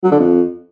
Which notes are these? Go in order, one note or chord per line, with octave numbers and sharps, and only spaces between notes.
F#3
D3
F2